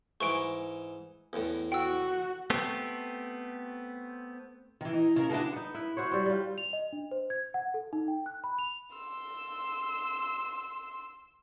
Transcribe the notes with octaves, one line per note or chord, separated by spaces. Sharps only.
G#2 E3 C#6 D7
E2 A2
F#4 G5 E6
A3 B3 C4 G4
D#3 E3
D#4
C#3 A#4
D4 E4 F#4 G#4 A4
B3 D#4
E4 B4
E4 F#4 C5 C#5
G3 C4
G3 F4
F7
D#5
D4
C5
G#6
F#5
A4
D#4
G5
F#6
B5
F7
C6 E6